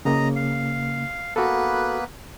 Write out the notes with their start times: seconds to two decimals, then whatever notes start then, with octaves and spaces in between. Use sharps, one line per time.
0.05 C#3 A#3 D#5 A#5
0.36 F5
1.36 A#3 B3 F#4 A4 B4